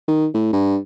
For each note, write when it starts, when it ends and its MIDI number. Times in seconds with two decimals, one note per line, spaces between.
0.08 0.27 51
0.34 0.49 45
0.53 0.78 43